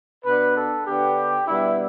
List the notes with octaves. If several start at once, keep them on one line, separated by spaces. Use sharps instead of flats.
B2 B3 D4 B4
A4
D3 B3 D4 G4
B2 G3 B3 D4 E4